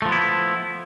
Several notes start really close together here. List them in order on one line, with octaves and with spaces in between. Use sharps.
A3 F3 B3 E4